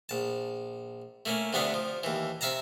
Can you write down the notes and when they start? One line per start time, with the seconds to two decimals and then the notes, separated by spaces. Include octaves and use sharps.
0.09 A#1 A5
1.26 A3 A#3 C#4
1.53 D2 C3 A3 B3 D4 F5
1.74 F3
2.03 D#2 E3
2.41 C3 E5 F5 A5 A#5